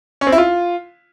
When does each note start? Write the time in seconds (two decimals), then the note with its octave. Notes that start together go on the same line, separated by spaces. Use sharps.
0.21 C#4
0.27 C4
0.32 E4
0.38 F4